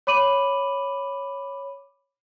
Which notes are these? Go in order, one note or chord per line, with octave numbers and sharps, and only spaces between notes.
C#5 B5 D6 D#7 F#7